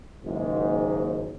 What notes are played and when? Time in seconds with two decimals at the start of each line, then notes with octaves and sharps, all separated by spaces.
0.24 F#1 D#2 G#2